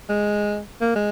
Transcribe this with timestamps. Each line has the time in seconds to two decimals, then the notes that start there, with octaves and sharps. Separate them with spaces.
0.09 G#3
0.81 A#3
0.96 G#3